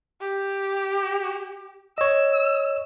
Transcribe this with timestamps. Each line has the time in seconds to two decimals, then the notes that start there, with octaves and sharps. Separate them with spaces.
0.21 G4
1.98 C#5 D#5 E6